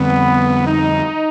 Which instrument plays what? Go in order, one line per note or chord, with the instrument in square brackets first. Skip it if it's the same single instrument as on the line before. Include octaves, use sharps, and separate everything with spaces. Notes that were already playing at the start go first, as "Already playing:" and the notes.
Already playing: [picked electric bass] F2 D3 G3 C4 [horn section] B3
[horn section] D#4